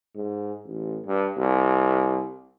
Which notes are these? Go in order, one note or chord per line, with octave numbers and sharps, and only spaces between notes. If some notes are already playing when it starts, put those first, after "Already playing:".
G#2
A1
G2
C2